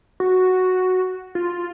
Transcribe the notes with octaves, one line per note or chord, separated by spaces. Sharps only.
F#4
F4